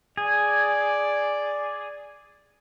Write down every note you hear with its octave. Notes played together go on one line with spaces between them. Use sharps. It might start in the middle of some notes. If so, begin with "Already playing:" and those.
G#4 D5